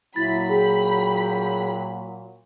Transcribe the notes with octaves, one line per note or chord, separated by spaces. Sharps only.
A#2 F#3 E4 B5 A6
G#4 G5